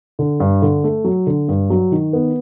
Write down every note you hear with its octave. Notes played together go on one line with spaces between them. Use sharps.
D3
G2
D3
A3
F#3
D3
G2
F#3
D#3
B3